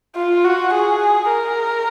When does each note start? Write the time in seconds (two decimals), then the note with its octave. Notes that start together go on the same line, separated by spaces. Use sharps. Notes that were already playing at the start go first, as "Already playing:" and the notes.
0.16 F4
0.45 F#4
0.74 G#4
1.31 A#4